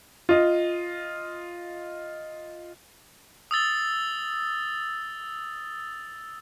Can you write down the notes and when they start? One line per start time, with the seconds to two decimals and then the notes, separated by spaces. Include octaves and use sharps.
0.29 F4 D#5
3.51 D#6 E6 A6 G7